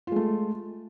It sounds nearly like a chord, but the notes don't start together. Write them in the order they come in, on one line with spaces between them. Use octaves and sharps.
F4 G#3 A3